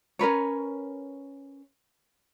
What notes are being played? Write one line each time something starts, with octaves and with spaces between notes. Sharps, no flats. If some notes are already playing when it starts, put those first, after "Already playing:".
C#4 A#4 B4 C#5